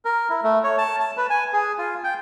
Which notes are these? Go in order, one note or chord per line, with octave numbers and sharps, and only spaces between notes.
A#4
E4
A3
C#5
A5
A5
B4
G#5
G#4
F4
G5